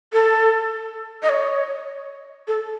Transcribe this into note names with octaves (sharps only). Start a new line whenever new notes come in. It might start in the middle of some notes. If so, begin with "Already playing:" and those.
A4
D#5
C#5
A4